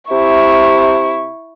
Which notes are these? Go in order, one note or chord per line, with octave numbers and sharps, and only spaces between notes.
C3 E4 C#6